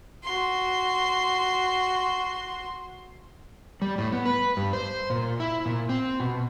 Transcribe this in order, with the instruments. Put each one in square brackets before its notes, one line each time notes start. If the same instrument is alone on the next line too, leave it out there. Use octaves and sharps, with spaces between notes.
[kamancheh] F#4 C6
[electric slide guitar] G3
A2
B3
B4
G2
C5
A#2
E4
A#2
C4
B2